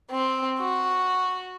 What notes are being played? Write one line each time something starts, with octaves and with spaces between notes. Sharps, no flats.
C4
F#4